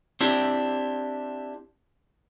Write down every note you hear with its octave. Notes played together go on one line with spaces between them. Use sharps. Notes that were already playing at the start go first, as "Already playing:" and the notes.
C4 D4 E4 G4